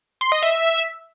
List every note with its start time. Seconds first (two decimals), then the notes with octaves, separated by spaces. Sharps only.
0.21 C6
0.32 D#5
0.43 E5